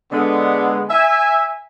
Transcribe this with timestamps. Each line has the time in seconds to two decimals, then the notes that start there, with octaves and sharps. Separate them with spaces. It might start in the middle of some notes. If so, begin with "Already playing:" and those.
0.12 D3 G#3 B3
0.90 E5 G#5